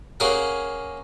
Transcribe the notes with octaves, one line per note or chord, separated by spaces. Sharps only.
A#3 C#4 G#4 A#4 F#5